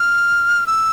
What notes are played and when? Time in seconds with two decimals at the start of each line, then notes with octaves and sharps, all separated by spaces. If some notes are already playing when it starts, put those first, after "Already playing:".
Already playing: F6
0.67 E6